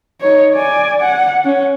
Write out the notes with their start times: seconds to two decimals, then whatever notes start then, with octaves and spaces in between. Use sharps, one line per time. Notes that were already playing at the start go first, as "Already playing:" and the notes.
0.21 D#4 C#5
0.54 D5 G#5
1.01 F#5
1.45 C#4